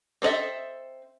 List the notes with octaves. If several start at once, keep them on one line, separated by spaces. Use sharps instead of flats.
C4 A4 C5 D#5 E5